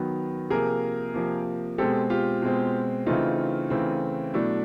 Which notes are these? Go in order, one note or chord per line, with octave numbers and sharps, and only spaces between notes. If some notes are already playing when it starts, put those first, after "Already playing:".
Already playing: D#3 F#3 B3
C3 F3 A#3 G#4 A#4
C3 F3 A#3
B2 G#3 C4 G4 A4
F4 G4
B2 G#3 C4
C#3 E3 A3 C4 D#4 F4
C#3 E3 A3 C4
B2 F#3 A3 D4 E4